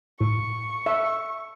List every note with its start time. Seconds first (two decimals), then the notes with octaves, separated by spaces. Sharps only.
0.20 A2 C#6
0.86 E5